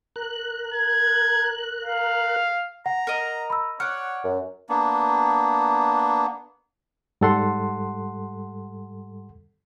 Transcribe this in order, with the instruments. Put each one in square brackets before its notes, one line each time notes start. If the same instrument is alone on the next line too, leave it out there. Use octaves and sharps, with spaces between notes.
[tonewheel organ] A#4 F#6
[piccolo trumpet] G#6
F5
[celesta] F#5 [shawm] A#5
[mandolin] A#4 D#5
[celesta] B5 E6
[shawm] C#5 [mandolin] D5 F#5 [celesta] F6
[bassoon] F#2
[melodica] A#3 B3 D4
[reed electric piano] G#2 G3 A4 F#5 C6